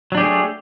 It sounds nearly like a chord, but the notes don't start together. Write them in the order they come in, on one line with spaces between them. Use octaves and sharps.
F#3 D4 G4 G#4 A3